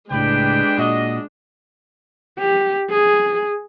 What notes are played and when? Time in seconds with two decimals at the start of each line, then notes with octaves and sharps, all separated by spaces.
0.11 C#2 A2 G#3 D4 G4 B4 G5
0.78 A#2 F#4 D#5
2.39 G4
2.90 G#4